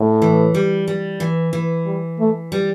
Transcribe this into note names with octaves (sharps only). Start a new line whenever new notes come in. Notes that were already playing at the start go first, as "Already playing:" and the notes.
Already playing: A2
E3
G3
G3
E3
E3
G3
A3
G3